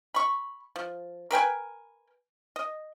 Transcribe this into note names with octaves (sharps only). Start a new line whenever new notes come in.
B5 C#6
F3
A#4 B4 G5 G#5
D#5